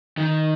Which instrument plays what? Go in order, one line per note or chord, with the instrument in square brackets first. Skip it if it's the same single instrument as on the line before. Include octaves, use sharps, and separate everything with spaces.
[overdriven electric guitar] D#3